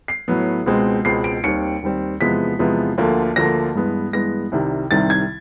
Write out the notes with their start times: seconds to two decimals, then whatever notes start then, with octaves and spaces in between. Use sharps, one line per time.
0.08 C7
0.28 A2 F#3 B3
0.66 C#2 B2 G#3 C4
1.05 C#2 B2 G#3 C4 C7
1.24 D7
1.43 D#2 D#3 G3 C4 C#7
1.82 D#2 D#3 G3 C4
2.21 E2 C3 F3 G#3 B3 B6
2.59 E2 C3 F3 G#3 B3
2.98 D2 D3 F3 A#3
3.36 D2 D3 F3 A#3 A#6
3.75 G2 E3 G#3 B3
4.13 G2 E3 G#3 B3 A#6
4.52 C2 C3 D#3 G3
4.91 C2 C3 D#3 G3 A6
5.10 G#6